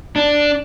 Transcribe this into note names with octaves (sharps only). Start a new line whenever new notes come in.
D4